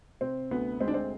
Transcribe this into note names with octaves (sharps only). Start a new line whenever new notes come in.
C3 C4
D2 B3
G#3 C4
D4
C4